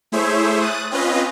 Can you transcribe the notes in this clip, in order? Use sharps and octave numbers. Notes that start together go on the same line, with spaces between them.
A3 E4 G#4 C5 C#5 E5
D#6 F#6 A6 D#7
C4 C#4 F4 B4 D#5